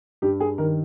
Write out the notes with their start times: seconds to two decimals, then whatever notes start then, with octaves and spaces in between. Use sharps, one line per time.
0.22 G2 G4
0.40 G#4
0.58 D#3 A#4